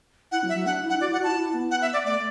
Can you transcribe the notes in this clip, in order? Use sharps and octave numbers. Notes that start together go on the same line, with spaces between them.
E4 F#5
F#3
E5
F#3
D4 F#5
E4
F#5
F#4 D5
E4
F#5
F#4
E4 A5
E4
B3
F#5
E5
D5
A3 D5